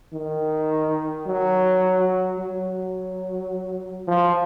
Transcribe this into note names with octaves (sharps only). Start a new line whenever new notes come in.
D#3
F#3
F#3
F3